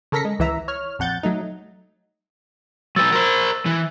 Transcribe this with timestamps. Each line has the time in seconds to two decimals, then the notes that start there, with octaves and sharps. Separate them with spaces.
0.12 C#3 A4 A#4 A#6 B6 C#7
0.25 G#3
0.39 C#2 E3 E5 A#5
0.68 C#5 F6
0.99 A#1 F2 F#5 G6 A6
1.23 F#3 A3 D#4
2.96 F#3 B4 E6 A6
3.12 A#4 C5
3.66 E3